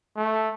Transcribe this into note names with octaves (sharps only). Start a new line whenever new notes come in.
A3